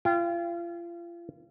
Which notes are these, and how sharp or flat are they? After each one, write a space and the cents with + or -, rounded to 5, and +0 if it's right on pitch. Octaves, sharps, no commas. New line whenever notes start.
F4 -35 G5 +0